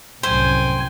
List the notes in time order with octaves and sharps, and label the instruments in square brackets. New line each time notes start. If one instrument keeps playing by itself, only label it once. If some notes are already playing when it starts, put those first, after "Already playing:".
[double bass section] C2 F#2 A2 [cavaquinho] C5 [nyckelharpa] G5 G#5